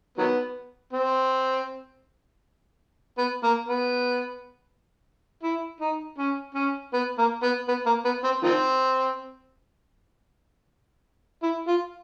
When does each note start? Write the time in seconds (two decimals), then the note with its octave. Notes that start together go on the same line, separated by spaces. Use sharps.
0.18 D#3 F#3 B3
0.93 C4
3.18 B3
3.44 A#3
3.68 B3
5.43 E4
5.80 D#4
6.18 C#4
6.55 C#4
6.93 B3
7.18 A#3
7.43 B3
7.68 B3
7.86 A#3
8.05 B3
8.24 C4
8.43 D#3 F3 C4
11.43 E4
11.68 F4